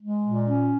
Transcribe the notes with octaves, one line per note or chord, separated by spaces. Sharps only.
G#3
A#2
C#4